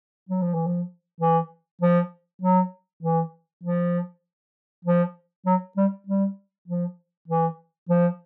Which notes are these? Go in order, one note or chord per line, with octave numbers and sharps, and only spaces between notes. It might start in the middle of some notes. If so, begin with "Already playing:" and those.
F#3
F3
E3
F3
E3
F3
F#3
E3
F3
F3
F#3
G3
G3
F3
E3
F3